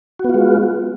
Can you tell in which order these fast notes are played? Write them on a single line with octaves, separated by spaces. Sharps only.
F#4 B3 F4 G#3